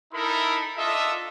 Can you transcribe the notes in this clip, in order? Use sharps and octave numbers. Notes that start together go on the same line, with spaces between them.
D#4 E4 A4 A#4 E5 B5
D4 F4 A4 D#5 E5